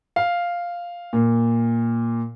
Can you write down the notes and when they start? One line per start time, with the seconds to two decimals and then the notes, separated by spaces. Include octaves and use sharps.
0.16 F5
1.13 A#2